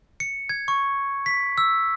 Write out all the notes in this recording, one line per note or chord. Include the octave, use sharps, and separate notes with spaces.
C#7
G#6
C#6
B6
E6